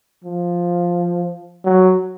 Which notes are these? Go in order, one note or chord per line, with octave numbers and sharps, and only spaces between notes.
F3
F#3